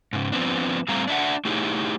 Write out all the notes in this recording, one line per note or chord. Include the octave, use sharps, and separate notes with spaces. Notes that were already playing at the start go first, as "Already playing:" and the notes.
G#2 C#3
F3 B3 C4 D4
A2 G3 A3 C4 F5 A#5
D4 E5 F#5
A3 D#4 E4 G4 G#4 C#5